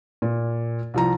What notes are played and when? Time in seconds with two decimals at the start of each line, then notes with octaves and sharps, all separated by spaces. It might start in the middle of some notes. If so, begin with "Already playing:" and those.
0.22 A#2
0.94 C2 F3 A#5